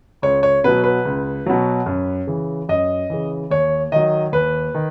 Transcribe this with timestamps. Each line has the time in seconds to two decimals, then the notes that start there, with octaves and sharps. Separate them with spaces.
0.22 C#2 C#5
0.43 C#5
0.64 B2 F#3 B4
0.84 B4
1.05 C#2
1.46 B2 F#3
1.86 F#2
2.27 C#3 E3
2.69 F#2 D#5
3.10 C#3 E3
3.50 D#2 C#5
3.92 D#3 F#3 D#5
4.32 D#2 B4
4.74 D#3